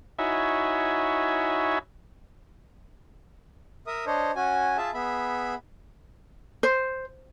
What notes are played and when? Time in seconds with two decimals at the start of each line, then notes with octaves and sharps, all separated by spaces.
0.19 D#4 E4 F#4 C#5 E5 G#5
3.87 A#4 E5 D#6
4.07 D4 C5 C#5 D#5
4.36 C#4 F#4 G#5
4.77 F4 G#4 E5 A5
4.94 B3 G#4 E5 B5
6.63 C5